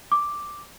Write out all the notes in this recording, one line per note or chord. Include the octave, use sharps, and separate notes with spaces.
D6